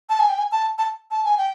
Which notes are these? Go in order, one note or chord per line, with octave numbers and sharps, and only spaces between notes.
A5
G#5
G5
G#5
A5
A5
A5
G#5
G5